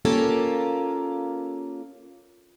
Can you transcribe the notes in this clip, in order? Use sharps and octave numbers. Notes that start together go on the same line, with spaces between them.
A#3 C#4 F4 G4 A4 A#4